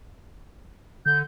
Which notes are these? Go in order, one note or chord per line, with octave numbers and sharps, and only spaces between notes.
D3 G6